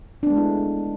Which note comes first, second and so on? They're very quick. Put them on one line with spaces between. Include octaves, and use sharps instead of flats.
D4 B3 G#3 A3 E4